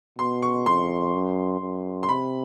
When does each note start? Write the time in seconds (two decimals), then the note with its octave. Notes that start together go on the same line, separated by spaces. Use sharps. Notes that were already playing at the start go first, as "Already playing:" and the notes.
0.18 B2 C6
0.42 C#6
0.66 F2 C6
1.14 F#2
1.61 F#2
2.03 C6
2.08 C3 B5